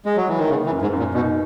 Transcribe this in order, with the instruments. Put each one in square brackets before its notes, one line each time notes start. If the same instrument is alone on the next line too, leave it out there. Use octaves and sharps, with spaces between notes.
[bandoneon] G#3
F#3
E3
D#3
[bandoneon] C#3 [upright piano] A#3
[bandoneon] E3
[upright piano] F#2
[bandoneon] G#2
[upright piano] F#2
[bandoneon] A#2
[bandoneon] B2 [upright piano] D#4